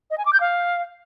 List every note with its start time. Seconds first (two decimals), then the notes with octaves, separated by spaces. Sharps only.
0.11 D#5
0.18 G#5
0.26 D6
0.33 G6
0.40 F5